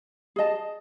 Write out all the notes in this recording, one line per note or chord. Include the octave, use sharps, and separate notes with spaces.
G#4 D#5 A5